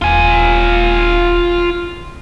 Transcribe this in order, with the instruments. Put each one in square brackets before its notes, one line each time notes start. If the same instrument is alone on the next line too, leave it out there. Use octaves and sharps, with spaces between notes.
[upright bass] D#1 E4 [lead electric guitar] F4 G#5